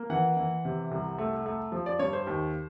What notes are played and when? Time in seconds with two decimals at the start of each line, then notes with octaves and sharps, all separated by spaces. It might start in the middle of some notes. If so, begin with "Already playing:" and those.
Already playing: A#3
0.10 E3 F#5
0.36 E3
0.65 C3
0.91 C2
1.18 A3
1.46 A3
1.72 F3
1.86 D5
1.99 G2 C#5
2.13 C5
2.27 D#2